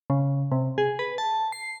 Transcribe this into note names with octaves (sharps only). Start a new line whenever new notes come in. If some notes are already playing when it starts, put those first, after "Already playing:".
C#3
C3
G#4
B4
A5
C7